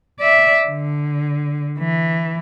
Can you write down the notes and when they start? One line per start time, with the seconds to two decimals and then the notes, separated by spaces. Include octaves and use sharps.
0.20 D5 E5
0.68 D3
1.79 E3